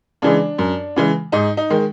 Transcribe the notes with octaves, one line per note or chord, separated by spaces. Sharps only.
C#3 E3 G#3 D4
F#2
C#3 E3 G#3
G#2 D#4
D#4
D#3 G#3